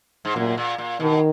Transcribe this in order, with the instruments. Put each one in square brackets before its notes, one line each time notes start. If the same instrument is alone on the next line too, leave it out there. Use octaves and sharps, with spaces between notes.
[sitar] G#2
[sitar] F#2 [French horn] A#2
[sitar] A#2
A#2
[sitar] B2 [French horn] D#3